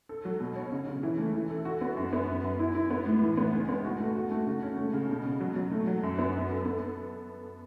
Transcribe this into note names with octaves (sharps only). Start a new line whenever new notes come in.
A4
F#3
B2
C#5
C#3
C#3
E3
A3
E3
A4
F#4
B3
F#2
B3
F#2
F#2
E4
E4
B3
A2
E3
B3
C#2
B3
F#4
A3
F#4
A3
C#3
C#4
A3
C#3
B2
B2
F#3
F#3
A3
F#3
F#2
B3
F#2
A4
B3